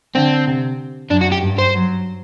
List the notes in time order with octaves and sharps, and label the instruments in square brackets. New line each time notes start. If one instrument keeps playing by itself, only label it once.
[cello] D3 [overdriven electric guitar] C4
[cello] C3
[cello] F#2 [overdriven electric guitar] D4
[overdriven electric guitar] F#4
G4
[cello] G2
[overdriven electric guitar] C5
[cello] F#3